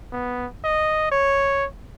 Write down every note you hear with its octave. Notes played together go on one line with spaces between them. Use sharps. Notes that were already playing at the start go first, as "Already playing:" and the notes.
B3
D#5
C#5